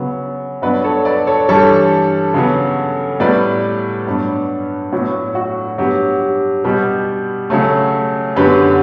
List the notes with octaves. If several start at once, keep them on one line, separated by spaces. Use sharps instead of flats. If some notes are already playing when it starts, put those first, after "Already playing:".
Already playing: C#3 F#3 B3
G2 F#3 B3 B4 D5
A4 C#5
B4 D5
A4 C#5
G2 E3 G3 A4 C#5
C#3 F#3 B3
A2 G3 B3 B4 D5
G2 F#3 B3
A2 F#3 B3 F#4
F#4
G2 F#3 B3 G4
G4
B2 G3 B3 G4
C#3 F#3 A3
F#2 D3 F#3 B3 G4 B4